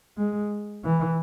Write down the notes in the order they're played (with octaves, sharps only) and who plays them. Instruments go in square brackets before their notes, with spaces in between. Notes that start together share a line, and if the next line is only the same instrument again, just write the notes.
[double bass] G#3
E3